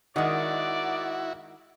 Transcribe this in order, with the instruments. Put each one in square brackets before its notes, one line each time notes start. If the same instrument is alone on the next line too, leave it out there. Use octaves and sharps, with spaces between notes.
[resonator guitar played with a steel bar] D#3 G#3 [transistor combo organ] E4 F#4 [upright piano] A#4 D#5 F#5 [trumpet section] D5